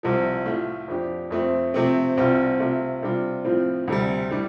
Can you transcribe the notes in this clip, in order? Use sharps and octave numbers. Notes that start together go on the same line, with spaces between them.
C2 C3 F3
A2 A3 F4
F2 F3 D4 G4
F2 F3 A3 C4
C3 F3 A3 C4
C2 C3 G3 C4 F4
C3 A3 F4
C3 G3 D4 F4
A2 F3 C4 F4
D2 C3 G3
A2 G3 D4